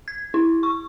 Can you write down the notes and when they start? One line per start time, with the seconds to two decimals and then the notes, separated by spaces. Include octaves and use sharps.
0.08 G#6
0.34 E4
0.63 C#6